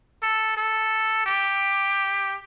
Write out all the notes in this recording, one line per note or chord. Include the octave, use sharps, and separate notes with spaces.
A4
A4
G4